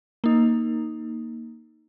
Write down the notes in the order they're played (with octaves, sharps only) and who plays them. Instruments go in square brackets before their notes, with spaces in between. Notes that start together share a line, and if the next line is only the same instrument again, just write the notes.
[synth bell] A#3 D#4